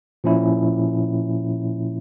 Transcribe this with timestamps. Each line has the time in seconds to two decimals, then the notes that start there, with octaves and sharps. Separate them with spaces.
0.24 A#2 F3 C#4 E4